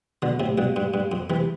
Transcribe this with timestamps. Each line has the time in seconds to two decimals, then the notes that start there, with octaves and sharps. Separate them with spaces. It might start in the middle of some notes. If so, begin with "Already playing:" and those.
0.22 B2 D3
0.40 A2 C3
0.58 G2 B2
0.76 G2
0.94 G2
1.12 F2
1.30 C3 E3